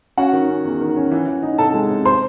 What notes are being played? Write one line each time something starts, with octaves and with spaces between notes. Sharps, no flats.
C#4 F#4 F#5
D#3
C#4
E2
D#3
C#4
E3
E3
D#4
C3 A4 A5
G#3
C3
C5 C6